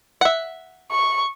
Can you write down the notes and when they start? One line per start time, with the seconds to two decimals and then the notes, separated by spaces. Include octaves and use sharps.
0.21 E5 F#5
0.92 C#6